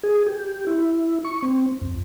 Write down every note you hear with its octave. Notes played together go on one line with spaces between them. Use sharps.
G#4
G4
E4
C#6
C4
F2